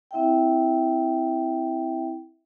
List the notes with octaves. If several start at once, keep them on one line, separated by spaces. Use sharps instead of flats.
C4 E4 E5 F#5 G5